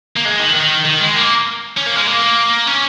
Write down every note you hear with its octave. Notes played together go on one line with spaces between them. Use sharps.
A#3
G#3
D#3
D#3
D#3
G#3
A#3
C#4
A#3
G#3
A#3
C#4